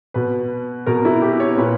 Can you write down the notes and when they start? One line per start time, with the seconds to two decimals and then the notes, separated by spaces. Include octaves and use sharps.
0.14 B2 B4
0.87 B2 A#4
1.05 E4
1.22 G4
1.40 C#5
1.58 A#2 B4